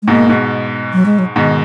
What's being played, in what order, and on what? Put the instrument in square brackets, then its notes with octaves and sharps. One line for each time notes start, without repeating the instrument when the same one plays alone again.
[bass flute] G#3
[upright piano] G#2 B2 [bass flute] A#3
[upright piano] G#2 B2
[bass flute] F#3
G#3
F#3
[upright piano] G#2 B2 [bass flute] D#3